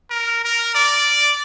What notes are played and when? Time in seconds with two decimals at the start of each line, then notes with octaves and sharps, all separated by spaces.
0.10 A#4
0.45 A#4
0.75 D5